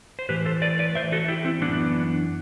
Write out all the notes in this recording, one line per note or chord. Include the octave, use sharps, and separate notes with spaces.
C5
A2 E3 G4 B4
A4 C5
B4 D5
B4 D5
A2 E3 C5 E5
F#4 A4
E4 G4
C4 E4
F#2 E3 B3 D4